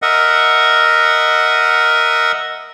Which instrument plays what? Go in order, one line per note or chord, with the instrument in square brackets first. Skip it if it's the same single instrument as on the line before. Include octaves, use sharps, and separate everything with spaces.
[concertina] A#4 D#5 E5 F#5